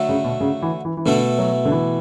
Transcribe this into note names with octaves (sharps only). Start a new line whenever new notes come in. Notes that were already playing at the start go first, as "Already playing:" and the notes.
Already playing: D3 F#3 A3
C#3
B2
C#3
E3
E3
E3
B2 D3 A3 E4
F#3
D3
E3